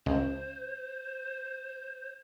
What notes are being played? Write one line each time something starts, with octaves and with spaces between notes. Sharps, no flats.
C#2 C5